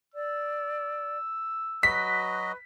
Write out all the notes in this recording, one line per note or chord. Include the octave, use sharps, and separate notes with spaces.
D5 E6
F#3 F#4 B4 D#5 B6